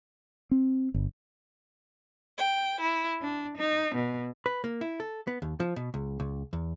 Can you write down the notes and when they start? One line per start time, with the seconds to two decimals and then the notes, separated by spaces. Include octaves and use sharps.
0.51 C4
0.94 G1
2.37 G5
2.80 E4
3.22 D4
3.56 D#4
3.94 B2
4.46 B4
4.64 A#3
4.81 E4
5.00 A4
5.27 B3
5.42 D#2
5.60 F3
5.76 B2
5.94 C#2
6.20 C#2
6.53 E2